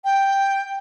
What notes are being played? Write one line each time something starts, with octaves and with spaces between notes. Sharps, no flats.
G5